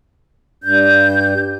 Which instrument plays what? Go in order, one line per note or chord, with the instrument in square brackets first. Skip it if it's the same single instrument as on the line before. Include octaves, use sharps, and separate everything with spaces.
[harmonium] G2 [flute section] G6